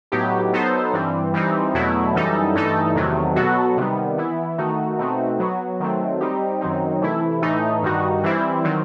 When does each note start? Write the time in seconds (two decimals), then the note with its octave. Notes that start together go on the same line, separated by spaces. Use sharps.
0.12 A2 F#3 B3 D#4 G4
0.52 F#3 B3 D#4 A4 C5
0.93 G2 E3 G3 C4
1.34 E3 G3 C4 D#4
1.74 E2 B2 F#3 A3 E4
2.15 F#2 E3 G3 D#4 A4
2.55 G2 E3 A3 D#4 A4
2.95 E2 C3 D#3 F#3 A3
3.36 B2 F#3 B3 F#4 A4
3.77 C3 D#3 G3 B3
4.18 E3 B3 E4
4.58 D#3 A3 D#4 F#4
4.99 B2 A3 C4 D#4 F#4
5.39 F#3 B3 F#4
5.80 D#3 F#3 A3 C4
6.21 G3 C4 D#4 G4
6.61 F#2 D#3 F#3 C4 D#4
7.02 C3 E3 A3 E4
7.42 A2 E3 A3 D#4
7.83 G2 D#3 G3 D#4 F#4
8.23 E3 G3 C4 E4
8.64 D#3 F#3 C4